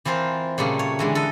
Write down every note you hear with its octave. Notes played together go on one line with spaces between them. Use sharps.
E3 C4 F4 A#4 C5
A#2 C#3 G3 A3 A#3
C#5
D3 E3 G#3
A4 D#5